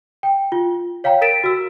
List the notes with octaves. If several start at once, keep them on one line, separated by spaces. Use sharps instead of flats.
G5
F4
C#5 F5 G5 A#5
A#4 A6 B6 D7 E7
F#4 E6